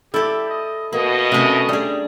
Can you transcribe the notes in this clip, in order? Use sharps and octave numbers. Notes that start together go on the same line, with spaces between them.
E4 G4 A4 D5
D#5
B2 A#3 D#5
C3 A3 C#4
G3 D4 G#4